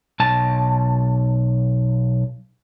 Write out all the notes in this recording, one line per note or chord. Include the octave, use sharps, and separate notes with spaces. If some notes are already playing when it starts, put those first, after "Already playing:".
B1 A5